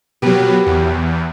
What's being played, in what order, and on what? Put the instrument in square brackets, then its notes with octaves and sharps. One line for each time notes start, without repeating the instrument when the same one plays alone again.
[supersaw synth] B2 F#3 [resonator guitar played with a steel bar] G4 A#4 B4
[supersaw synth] E2